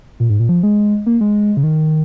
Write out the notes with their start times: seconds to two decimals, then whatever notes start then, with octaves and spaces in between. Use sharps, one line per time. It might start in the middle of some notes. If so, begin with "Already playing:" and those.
0.20 A#2
0.30 G#2
0.40 A#2
0.49 F3
0.63 G#3
1.06 A#3
1.21 G#3
1.57 C#3
1.63 D#3